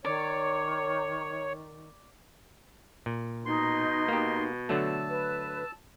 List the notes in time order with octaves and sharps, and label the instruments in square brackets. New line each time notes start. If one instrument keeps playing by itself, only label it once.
[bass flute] D#3 [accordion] C#5 [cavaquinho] D5
[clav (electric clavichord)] A#2
[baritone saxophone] B2 [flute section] D#4 [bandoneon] C6
[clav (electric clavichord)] A#3 G4
[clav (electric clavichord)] D3 F#3 A3 [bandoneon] A5 E6
[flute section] B4